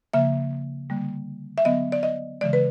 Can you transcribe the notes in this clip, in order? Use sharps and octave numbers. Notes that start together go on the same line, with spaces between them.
C#3 F3 A#3 E5
D3 G3 A#3
E5
D3 F#3 B3 D#5
D5
D#5
C#3 E3 G#3 D5
B4